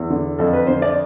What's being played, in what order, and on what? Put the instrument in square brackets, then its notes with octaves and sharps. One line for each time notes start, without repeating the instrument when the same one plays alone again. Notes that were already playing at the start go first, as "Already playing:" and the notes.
Already playing: [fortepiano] E2
D3
F2 A4
B4
D3 C5
D5